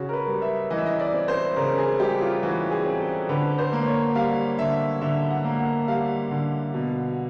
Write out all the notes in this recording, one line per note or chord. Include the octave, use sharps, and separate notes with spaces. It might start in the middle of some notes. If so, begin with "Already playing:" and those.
Already playing: C#3 F#4
A#4
B4
G3
E5
E3 D#5
E5
D#5
D5
C4
C5
C#3 A#4
G#4
G3 G4
F4
E3 F#4
G#4
C4
A4
D3 B4
C5
A#3
C#5
G3 F5
D3 E5
D3 E5
F#5
A#3
F#5
G3 F5
D3
B2